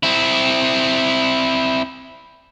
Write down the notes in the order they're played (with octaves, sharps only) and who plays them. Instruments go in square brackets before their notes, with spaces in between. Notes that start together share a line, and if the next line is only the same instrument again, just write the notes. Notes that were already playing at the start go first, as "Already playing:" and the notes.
[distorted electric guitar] C4 E4